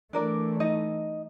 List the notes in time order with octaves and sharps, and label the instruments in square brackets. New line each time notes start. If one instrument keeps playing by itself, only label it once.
[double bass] E3 A3 [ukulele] D4 A#4 D5
[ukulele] D#4 D#5